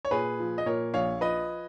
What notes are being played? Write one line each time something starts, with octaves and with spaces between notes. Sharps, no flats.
C#5
A#2 G#4 B4
F3
D#5
A#2 A#4 C#5
A#1 C#5 F5
F3 B4 D#5